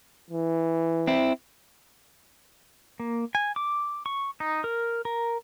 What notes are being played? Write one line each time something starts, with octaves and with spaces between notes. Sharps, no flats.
E3
C4 E4
A#3
G#5
D6
C#6
D#4
A#4
A#4